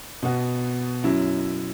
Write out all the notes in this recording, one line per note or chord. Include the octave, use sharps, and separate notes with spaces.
B2 B3 F#4
F#2 F#3 E4